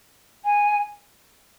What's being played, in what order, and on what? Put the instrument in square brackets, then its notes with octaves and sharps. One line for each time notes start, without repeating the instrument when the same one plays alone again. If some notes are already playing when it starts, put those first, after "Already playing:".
[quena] G#5